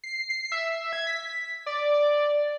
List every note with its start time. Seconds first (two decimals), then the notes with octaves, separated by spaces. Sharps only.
0.04 C7
0.30 C7
0.52 E5
0.93 G#6
1.07 B6
1.66 D5